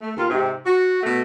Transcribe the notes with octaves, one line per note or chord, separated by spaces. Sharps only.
A3
D#2 F4
G#2 C3
F#4
B2 A3